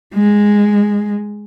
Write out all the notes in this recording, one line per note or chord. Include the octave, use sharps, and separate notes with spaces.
G#3